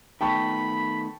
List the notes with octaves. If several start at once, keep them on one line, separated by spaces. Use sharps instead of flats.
D#3 A3 B3 G5 A5 B5 C#6